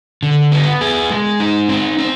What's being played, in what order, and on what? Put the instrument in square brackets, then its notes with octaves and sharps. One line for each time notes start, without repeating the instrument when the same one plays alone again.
[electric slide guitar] D3
B3
G#4
G#3
D#4
C4
C4